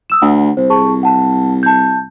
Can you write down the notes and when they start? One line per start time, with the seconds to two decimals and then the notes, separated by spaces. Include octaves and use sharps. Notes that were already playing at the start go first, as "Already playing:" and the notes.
0.10 D#6 E6 E7
0.22 D2 F#5
0.57 C2 C5
0.70 G#4 A5 C#6
1.03 F#5 A5
1.63 A5 G6